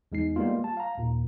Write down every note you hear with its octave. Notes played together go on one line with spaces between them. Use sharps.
E2 G#3 D#4 C7
G3 G#3 A#3 B3 F4
A5
F5 A#5
D#2 A#2